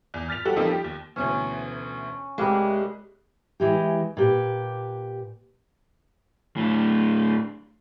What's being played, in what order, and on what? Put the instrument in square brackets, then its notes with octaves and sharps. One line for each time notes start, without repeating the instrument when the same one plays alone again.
[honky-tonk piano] E2
F6 A6 B6 F7
G3 F#4 A4
F3 G3 A#3 C4 D#4 A4
G4
D#2
[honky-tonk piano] D2 B2 E3 [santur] C#4
[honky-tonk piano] C2 F#6 [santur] G3 A#3 [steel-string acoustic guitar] G#3
[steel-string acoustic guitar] E3 G#3 G4
A#2 G4 B4
[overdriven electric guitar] A2 D4